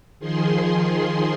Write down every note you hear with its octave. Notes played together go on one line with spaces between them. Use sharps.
D#3 F3 G#4 C6